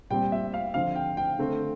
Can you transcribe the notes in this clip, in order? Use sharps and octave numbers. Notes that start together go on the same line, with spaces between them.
A#2 G3 C4 G5
E5
F5
D3 F3 C4 F5
G5
G5
D3 A3 C4